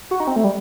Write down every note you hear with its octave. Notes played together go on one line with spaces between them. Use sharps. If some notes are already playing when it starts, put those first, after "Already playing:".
F#4
D#4
C4
A3
G3